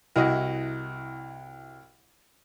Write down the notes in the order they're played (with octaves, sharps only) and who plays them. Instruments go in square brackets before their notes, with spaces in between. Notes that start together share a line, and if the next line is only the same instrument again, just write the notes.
[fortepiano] C2 E4 F#4 D#5